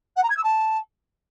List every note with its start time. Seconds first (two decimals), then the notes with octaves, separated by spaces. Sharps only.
0.16 F#5
0.23 A#5
0.30 G#6
0.36 E6
0.43 A5